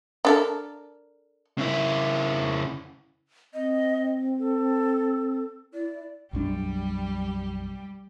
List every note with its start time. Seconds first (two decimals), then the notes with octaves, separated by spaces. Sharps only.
0.25 D4 A4 A#4
1.58 C#3 E4
3.53 C4 D#5
4.39 A4
5.74 E4 D5
6.33 B1 F#2 G3 D4 G4